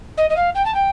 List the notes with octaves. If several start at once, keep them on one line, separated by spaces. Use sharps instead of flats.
D#5
D#5
F5
G5
A5
G5